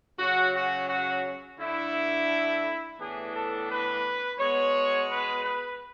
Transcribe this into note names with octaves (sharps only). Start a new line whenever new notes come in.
C#3 F#3 C#4 F#4
F#4
F#4
D3 A3 D4 E4
A2 E3 B3 D4 G#4
A4
B4
B2 G#3 B3 C#5
B4
B4